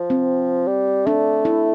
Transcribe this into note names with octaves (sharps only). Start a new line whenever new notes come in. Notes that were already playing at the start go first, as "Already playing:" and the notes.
Already playing: F3
C4
G3
A3 D4
E4